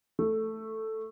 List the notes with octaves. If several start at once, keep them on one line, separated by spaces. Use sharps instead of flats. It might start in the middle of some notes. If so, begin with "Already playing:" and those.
A3